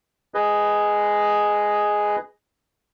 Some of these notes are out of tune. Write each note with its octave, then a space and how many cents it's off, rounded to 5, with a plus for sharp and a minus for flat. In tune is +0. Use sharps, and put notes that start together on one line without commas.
G#4 +0 B4 +15 D#5 +0